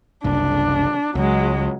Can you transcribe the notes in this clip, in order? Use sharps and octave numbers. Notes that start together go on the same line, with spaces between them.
F#1 C2 D4
C#2 F#3 G#3